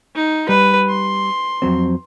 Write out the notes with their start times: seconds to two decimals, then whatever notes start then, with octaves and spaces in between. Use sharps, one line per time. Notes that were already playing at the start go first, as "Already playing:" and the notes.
0.15 D#4
0.49 G3 B4
0.89 C6
1.62 F2 F#3 C4